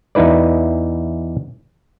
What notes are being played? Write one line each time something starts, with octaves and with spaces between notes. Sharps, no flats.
E2 D#4 E4 B4 D5